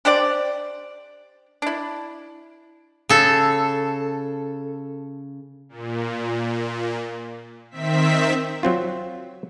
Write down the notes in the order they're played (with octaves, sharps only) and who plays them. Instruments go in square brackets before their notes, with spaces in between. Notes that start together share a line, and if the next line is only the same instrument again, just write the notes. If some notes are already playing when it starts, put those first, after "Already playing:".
[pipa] D4 G4 C5 D5
D4 E4
[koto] C#3 A4
[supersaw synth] A#2
D#3 C4 E5 B6
[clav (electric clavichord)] F#3 C4 F4